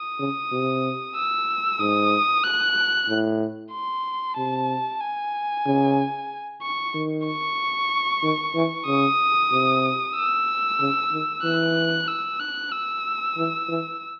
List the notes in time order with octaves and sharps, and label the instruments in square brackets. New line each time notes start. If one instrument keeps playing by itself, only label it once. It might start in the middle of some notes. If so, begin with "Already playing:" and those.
Already playing: [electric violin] D#6
[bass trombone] C#3
C3
[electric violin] E6
[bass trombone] G#2 [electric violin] D#6
[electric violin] F#6
[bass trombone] A2
[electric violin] C6
[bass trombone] C3 [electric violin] A5
[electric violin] G#5
[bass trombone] C#3
[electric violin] C#6
[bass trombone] D#3
[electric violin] C#6
[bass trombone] D#3
E3
[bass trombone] C#3 [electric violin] D#6
[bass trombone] C3
[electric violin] E6
[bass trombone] C#3
D#3
[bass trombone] E3 [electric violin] F#6
[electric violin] E6
F#6
E6
[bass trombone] E3
E3